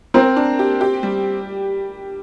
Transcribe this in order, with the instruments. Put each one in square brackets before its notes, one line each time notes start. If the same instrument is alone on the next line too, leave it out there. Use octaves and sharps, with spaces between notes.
[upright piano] C4 [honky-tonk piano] A#4
[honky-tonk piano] D4
G4
G4
G3